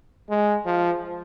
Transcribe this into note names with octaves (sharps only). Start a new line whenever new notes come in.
G#3
F3